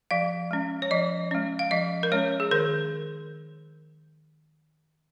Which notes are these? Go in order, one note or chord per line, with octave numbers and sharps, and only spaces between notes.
F3 F5
G#3 C#4
C#5
F3 D#5
G#3 C#4
F5
F3 D#5
A#4
G#3 C#4 C#5
G#4
D#3 A#4